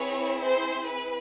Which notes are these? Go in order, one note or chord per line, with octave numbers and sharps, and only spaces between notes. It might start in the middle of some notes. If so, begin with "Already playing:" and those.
Already playing: C4 E4 G#4 B4 C#5
C5
B4